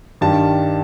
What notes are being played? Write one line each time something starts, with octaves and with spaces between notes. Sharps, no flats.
G2 D#3 G3 A5